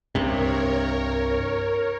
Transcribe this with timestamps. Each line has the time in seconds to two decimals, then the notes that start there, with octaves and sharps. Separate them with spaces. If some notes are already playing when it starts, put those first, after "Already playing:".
0.15 C2 G2 C3 A#4 C#5